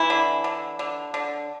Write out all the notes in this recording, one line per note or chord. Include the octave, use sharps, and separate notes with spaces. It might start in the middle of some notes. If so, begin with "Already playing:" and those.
Already playing: E3 E4
D3
D3
D3
D3